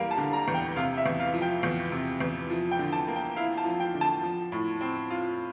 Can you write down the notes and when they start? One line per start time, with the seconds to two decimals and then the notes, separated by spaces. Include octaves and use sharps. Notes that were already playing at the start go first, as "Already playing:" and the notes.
Already playing: E2 G3 A#3 F5
0.11 A5
0.18 D3
0.33 A#5
0.48 E2
0.54 G5
0.76 C3 F5
0.97 E5
1.06 E2
1.20 F5
1.34 F3
1.42 G5
1.63 E2
1.92 C3
2.20 E2
2.50 F3
2.72 G5
2.79 D3
2.92 A5
3.08 A#3
3.15 G5
3.36 E4 F5
3.58 A5
3.65 F3
3.80 G5
3.95 D3
4.01 A5
4.23 F3
4.52 A2
4.81 C4
5.10 F4